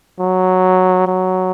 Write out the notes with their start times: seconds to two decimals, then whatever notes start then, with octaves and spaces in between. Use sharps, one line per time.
0.20 F#3
1.07 F#3